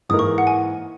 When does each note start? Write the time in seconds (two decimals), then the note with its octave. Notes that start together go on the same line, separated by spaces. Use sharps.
0.09 G#2 E3 A#3 D#4 A#4 D#6
0.19 C#6
0.38 F#5
0.47 G#5